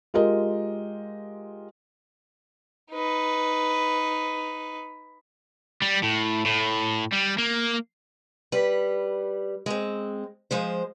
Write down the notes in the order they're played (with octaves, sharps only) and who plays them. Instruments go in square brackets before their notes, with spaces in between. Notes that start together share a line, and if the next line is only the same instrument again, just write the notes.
[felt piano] G#3 F4 G4 A#4 D#5
[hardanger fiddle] D#4 B4
[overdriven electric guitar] G3
A2
A2
G3
A#3
[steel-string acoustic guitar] G3 B4
G#3 C4
F3 G#3 C5